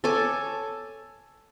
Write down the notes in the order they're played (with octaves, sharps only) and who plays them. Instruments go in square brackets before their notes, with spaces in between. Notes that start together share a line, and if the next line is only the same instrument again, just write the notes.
[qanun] A4 C#5 G#5 D6